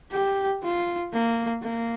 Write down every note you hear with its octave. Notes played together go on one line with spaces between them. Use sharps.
G4
F4
A#3
A#3